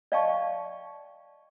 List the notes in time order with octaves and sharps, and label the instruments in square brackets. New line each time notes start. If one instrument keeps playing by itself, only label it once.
[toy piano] D5 D#5 F5 G5 A5 C#6